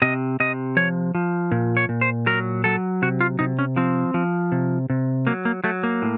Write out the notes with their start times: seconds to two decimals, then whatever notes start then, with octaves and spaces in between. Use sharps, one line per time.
0.02 C3 D#5
0.40 C3 D#5
0.77 F3 C#5
1.15 F3
1.51 A#2
1.77 C#5
1.89 A#2
2.01 C5
2.26 F#3 A#4
2.64 F#3 A4
3.02 C3 F#4
3.20 F4
3.39 C3 D#4
3.59 C#4
3.76 F3 C4
4.14 F3
4.52 C3
4.90 C3
5.27 F#3 A#3
5.45 A#3
5.64 F#3 A3
5.83 A#3
6.02 A2